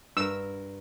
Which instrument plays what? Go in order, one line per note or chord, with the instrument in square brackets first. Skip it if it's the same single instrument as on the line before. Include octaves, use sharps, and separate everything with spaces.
[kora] G2 A#4 [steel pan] E6